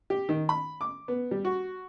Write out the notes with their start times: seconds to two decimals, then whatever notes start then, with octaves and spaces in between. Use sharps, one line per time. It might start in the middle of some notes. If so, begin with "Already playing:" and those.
0.10 G4
0.29 D#3
0.49 B5
0.81 D6
1.08 B3
1.31 G3
1.45 F#4